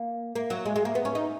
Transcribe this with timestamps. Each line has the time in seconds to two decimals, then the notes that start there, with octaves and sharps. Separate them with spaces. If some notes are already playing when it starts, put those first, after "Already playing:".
Already playing: A#3
0.35 A#3
0.50 F#3
0.65 G#3
0.76 G#3
0.85 A#3
0.95 B3
1.05 C#4
1.15 D#4